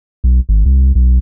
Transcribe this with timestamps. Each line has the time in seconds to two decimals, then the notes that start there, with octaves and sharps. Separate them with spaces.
0.24 B1
0.49 G#1
0.66 C2
0.95 B1